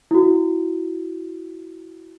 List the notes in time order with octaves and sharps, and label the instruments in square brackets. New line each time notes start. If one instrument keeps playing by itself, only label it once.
[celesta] E4 F#4